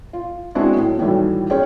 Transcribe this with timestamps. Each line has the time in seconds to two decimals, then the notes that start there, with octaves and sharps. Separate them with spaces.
0.13 F4
0.55 G#3 B3 C4 D4 E4 F#4
0.74 A2 F#3
0.99 A2 D#3 E3 F#3 G3 A3
1.50 C#4 G#4 G5